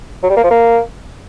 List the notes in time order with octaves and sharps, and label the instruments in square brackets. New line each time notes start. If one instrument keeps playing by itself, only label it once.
[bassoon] F#3
G3
A#3
F3
A#3